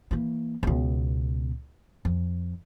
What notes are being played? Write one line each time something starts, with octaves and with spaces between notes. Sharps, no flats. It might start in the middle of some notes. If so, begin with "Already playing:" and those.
E3 A#3
C#2 B2
F2